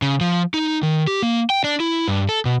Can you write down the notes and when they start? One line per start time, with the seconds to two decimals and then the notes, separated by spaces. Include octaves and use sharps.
0.02 C#3
0.21 F3
0.54 D#4
0.83 D#3
1.07 G4
1.23 A#3
1.50 G5
1.64 D4
1.80 E4
2.08 G2
2.29 A4
2.45 B2